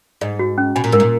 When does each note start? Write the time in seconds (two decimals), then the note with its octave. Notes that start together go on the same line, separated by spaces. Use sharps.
0.21 G#2 D#5
0.39 F#4
0.58 C#4
0.76 B2 G#5
0.84 A#2
0.92 G#2 A#4
1.00 A#2